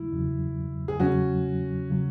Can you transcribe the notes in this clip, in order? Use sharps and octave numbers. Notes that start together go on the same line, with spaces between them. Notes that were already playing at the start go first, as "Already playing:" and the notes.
Already playing: E2 C#3 F#3 E4
E2 C#3 F#3
G#4
E2 C#3 F#3 C#4 F#4
C#3 F#3